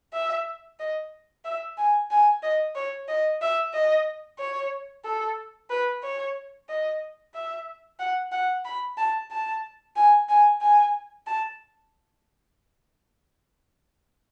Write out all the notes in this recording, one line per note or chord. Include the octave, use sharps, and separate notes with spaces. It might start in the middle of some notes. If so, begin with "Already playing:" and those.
E5
D#5
E5
G#5
G#5
D#5
C#5
D#5
E5
D#5
C#5
A4
B4
C#5
D#5
E5
F#5
F#5
B5
A5
A5
G#5
G#5
G#5
A5